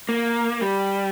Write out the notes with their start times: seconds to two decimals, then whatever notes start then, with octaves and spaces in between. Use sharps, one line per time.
0.09 A#3
0.61 G3